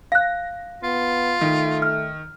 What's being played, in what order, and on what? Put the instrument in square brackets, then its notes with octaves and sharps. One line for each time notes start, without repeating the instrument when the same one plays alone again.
[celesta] F5 F#6 [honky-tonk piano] A#6
[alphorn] B3 [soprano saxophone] F4
[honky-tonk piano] D#3 [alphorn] A3
[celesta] F6